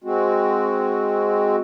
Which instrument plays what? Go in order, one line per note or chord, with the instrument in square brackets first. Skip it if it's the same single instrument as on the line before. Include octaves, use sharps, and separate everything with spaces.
[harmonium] G#3 C4 F#4